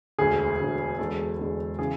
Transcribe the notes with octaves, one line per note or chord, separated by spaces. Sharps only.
E1 D2 D3 G#4
E1 D2 D3
E2 D3 G#3 A4
E2 D3 G#3
C#3 E3 G#4